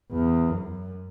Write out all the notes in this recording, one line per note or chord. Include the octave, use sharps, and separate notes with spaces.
E2
F#2